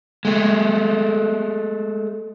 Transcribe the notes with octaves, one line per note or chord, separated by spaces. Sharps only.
G#3 A3